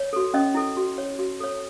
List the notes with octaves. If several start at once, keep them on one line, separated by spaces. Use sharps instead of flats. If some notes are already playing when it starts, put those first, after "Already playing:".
Already playing: C#5
F#4 A4
C#4 D#5
E4 A4
F#4
C#5
F#4
A4 C#5